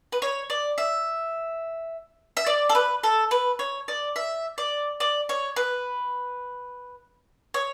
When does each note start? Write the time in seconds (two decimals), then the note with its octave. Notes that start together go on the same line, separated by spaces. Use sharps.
0.12 B4
0.22 C#5
0.50 D5
0.78 E5
2.37 E5
2.46 D5
2.69 A4
2.75 B4
3.03 A4
3.31 B4
3.59 C#5
3.88 D5
4.16 E5
4.58 D5
5.00 D5
5.29 C#5
5.56 B4
7.54 C#5